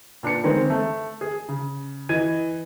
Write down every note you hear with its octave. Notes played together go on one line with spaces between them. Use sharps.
A#2 D4 B4 C#7
D3 D#3 G#3 B3 C4
A3
G#4
C#3
E3 D#5 G#6 D#7